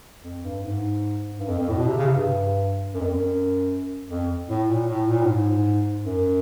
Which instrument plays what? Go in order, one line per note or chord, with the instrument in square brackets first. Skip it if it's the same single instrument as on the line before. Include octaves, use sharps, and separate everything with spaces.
[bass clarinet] F2
G2
G#2
G2
F2
F2
A2
B2
C3
C#3
C3
G2
F#2
F2
F#2
F2
A2
A#2
A2
A#2
A2
G#2
F#2